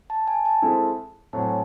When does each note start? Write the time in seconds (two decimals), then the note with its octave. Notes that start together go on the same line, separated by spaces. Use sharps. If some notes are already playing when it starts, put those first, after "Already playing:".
0.10 A5
0.28 G#5
0.45 A5
0.62 G#3 C4 E4 A4
1.33 A2 F#3 C4 F#4 A5
1.42 G#5